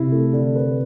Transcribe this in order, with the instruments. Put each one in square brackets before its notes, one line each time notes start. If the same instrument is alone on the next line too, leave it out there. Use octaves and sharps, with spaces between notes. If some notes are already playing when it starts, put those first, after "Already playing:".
Already playing: [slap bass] C3 [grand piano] E4
[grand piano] A3
D3
B4